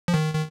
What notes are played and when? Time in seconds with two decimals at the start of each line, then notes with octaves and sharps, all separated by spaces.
0.08 F3
0.14 D#3
0.34 D#3